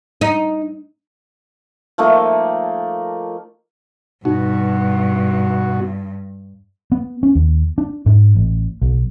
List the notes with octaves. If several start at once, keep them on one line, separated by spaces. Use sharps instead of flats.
D#4
F3 A3 A#3 D#4
G2 B2 D#4 F#4
B3
C#4
D#2
D4
G#2
A1
B1